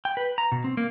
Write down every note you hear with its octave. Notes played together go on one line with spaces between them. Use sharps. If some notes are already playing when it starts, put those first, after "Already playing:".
G5
B4
A#5
B2
C4
A#3